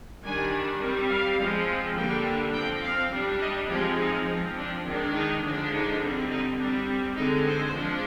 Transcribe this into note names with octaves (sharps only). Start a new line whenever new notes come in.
D#3 G3 D4 G#5
G3 C4 A#4
F5
F3 G#3 C4
D3 G3 A#3 D4 G5
F3 C4 G5
F5
G3 D4
D#5
F3 G#3 C4 G4
D#4
F3 C4
D4
D#3 G#3 D4
D#4
D3 F3 G#3 D4
D#4
D3 G3 C4
D#4
G3 C4 D4
D3 G#3 C4 D#4
C5
F3 G#3 D4